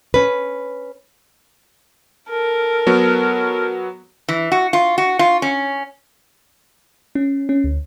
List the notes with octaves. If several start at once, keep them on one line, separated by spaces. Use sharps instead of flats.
C#4 B4
A4 A#4
F#3 B3 F#4
E3
F#4
F4
F#4
F4
C#4
C#4
C#4
D2